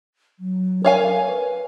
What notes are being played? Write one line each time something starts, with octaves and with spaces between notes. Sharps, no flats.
F#3
A#4 C#5 F5 G#5
B4